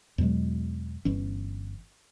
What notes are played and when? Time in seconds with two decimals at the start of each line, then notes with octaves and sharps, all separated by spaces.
0.18 E2 B2 F#3 G#3
1.05 G1 E3 C#4